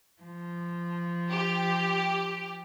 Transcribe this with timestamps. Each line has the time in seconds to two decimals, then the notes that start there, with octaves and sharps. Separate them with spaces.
0.21 F3
1.29 G4